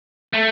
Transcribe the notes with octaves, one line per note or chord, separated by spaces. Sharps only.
A3